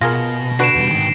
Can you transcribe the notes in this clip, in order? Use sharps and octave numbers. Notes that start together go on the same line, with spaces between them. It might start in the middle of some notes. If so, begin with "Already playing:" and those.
B2 F4 G#4 A#4 A#6
D3 F#4 B4 C7 D7 E7
E2 G3
G#2 D#3